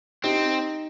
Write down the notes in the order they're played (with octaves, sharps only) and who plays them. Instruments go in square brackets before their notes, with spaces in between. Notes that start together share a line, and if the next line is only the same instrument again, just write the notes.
[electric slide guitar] C4 [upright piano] D#4 G4